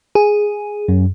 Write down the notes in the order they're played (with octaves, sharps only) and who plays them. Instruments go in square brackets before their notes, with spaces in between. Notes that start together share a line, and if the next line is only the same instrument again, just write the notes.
[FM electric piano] G#4
[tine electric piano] F#2